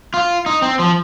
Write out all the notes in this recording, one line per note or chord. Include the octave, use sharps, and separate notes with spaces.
F4
D#4
C4
F3